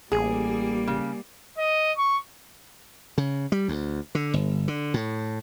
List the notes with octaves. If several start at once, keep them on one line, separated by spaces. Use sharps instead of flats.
A1 G3 A#3 G#4
C#3
D#5
C#6
C#3
G3
D2
D3
G1
D3
A2